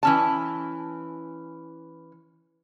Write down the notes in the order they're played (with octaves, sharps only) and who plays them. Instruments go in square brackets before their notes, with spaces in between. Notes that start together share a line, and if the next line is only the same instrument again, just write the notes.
[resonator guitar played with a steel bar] E3 C#4 A5